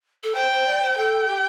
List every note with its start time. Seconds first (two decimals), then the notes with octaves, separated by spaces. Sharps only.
0.23 A4
0.35 C5 G5
0.51 C5
0.67 D5
0.82 C5
0.97 A4 G5
1.28 G4